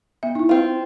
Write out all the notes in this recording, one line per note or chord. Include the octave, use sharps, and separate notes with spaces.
B3 E5
D#4 E4
C4 F4